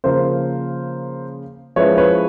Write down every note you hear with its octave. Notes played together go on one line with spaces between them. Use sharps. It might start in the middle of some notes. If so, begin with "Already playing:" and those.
C#3 F3 A#3 A#4 C5
F3 G#3 C#4 E4 B4 C#5
B4 C#5